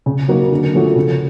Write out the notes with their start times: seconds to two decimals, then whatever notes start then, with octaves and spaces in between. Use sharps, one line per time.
0.06 C#3
0.28 F#3 A#3 D#4 F#4
0.52 D3
0.74 F3 A3 C#4 F#4
0.96 C#3